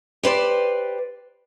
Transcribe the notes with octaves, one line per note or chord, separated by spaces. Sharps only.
G4 B4 C5 D5